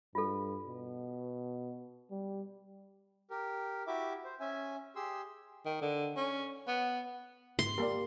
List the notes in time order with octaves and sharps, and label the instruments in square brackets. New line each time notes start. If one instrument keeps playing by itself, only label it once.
[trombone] G2 [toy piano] F4 A4
[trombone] B2
G3
[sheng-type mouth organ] G4 A#4
E4 F#4 G4 E5 D6
C5
C#4 E5 G#5
G4 G#4 C6 E6
[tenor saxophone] D#3
D3
C#4
B3
[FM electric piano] G#2 [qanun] C6
[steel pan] A#3 A#4 [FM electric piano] G4 D5